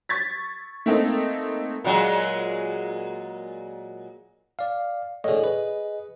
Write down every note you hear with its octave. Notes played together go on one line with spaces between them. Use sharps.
C#6 G#6 A6 B6
A3 A#3 C4 D#4 A4
A#2 F#3 G#3
D5 F5
A2 D3 G#4 D#5
B4